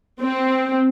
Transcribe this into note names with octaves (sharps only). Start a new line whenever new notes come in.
C4